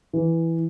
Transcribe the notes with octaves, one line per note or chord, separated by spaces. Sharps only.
E3